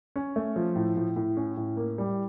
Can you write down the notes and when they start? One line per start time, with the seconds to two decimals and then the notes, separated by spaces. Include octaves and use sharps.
0.16 C#4
0.36 A3
0.56 F3
0.75 A2
0.97 A2
1.16 A2
1.37 C#4
1.57 A2
1.77 A#3
1.98 G3